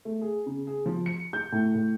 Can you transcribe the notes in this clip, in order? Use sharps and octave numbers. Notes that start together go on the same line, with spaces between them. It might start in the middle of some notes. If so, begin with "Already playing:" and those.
A3
G#4
C#3
G#4
F3
C#7
G6
A2
A2